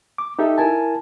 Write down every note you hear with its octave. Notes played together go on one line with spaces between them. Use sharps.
D6
D#4 G4 A4 E5
E4 A#4 G#5 A5